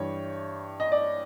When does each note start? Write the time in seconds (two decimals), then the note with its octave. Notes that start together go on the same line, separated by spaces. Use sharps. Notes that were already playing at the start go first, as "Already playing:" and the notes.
Already playing: G2 E3 G3 C#5
0.80 D#5
0.92 D5